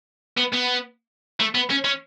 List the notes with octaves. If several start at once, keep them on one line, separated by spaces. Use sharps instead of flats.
B3
B3
A3
B3
C#4
C#4